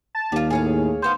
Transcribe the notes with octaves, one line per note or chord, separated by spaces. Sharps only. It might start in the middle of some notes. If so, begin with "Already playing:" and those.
A5
D#2 G3 F4
A2 G#4 C#5 F5
A#2 B3 C5 F5